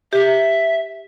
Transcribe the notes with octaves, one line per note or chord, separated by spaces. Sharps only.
G4 E5